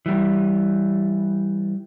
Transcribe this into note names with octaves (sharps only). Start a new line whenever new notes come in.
E3 G3